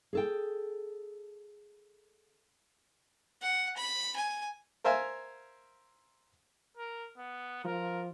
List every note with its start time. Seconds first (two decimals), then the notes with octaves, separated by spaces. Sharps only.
0.13 G#4 A4 G5
3.41 F#5
3.77 B5
4.16 G#5
4.84 A#4 C5 E5 F5 G#5
6.77 A#4
7.18 B3
7.65 F3 A#4